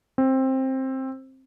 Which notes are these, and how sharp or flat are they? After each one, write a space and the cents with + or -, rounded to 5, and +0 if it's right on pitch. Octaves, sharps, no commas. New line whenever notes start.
C4 +15